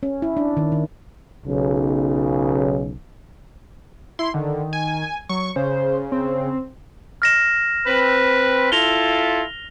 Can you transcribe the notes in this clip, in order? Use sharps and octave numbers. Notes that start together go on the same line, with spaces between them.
C#4
E4
D4
D#3
D#3
B1 C#3
E4 C6
D3 D#3
G#5
F#3 C#6
C#3 C5
C4
F6 A#6 E7
C4 B4
E4 F4 A4 A#6 F7 G7